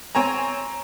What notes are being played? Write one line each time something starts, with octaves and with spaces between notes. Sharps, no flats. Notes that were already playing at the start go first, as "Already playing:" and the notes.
C4 C#5 G#5 A#5